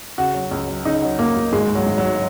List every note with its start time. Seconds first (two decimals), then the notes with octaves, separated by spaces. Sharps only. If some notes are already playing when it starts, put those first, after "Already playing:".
0.18 C#3 F#4
0.35 F#3
0.51 C#2
0.68 F#3
0.85 C#3 D#4
1.02 F#3
1.19 C#2 A#3
1.36 C#2
1.53 G#1 G#3
1.69 G#2
1.75 F#3
1.87 G#1
1.98 F#3
2.04 G#2